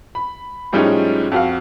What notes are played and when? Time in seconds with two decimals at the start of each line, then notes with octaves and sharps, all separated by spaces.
0.15 B5
0.73 A2 F3 G3 G#3 C#4 D#4
1.32 F2 F#4 F5